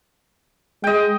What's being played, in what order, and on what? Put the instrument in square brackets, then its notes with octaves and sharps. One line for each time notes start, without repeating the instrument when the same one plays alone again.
[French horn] G#3 [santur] D#5 G5